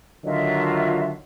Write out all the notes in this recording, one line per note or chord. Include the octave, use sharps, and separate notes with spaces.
D3 D#3 F#3 F4 D#5 E5